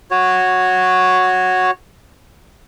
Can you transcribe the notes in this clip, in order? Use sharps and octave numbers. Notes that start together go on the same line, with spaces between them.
F#4 C#5